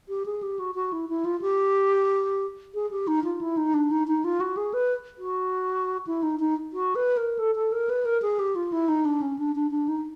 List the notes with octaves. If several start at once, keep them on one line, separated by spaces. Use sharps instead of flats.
G4
G#4
G4
F#4
F#4
E4
E4
F4
G4
G#4
G4
D#4
F4
E4
D#4
D4
D#4
D#4
F4
F#4
G#4
B4
F#4
E4
D#4
D#4
F#4
B4
A#4
A4
A4
A#4
B4
A#4
G#4
G4
F4
E4
D#4
D4
C#4
D4
D4
D4
D#4